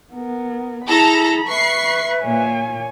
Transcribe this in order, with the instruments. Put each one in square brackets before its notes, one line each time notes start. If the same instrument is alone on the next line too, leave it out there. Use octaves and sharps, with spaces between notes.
[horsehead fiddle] B3 A#4
[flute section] E4 G#4 [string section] A4 A#5 [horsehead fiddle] B5
[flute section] B4 E5 [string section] C#6 C7
[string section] A#2 [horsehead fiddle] C#5 G#5